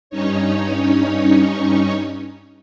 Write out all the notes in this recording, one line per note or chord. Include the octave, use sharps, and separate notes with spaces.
G2 C#4 D#4 C#5